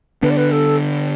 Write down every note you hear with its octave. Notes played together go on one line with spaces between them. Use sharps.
D3 B3 D4 B4
D5
B4
A4